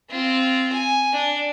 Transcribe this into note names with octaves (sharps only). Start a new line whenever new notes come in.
C4 F4
G#5
D4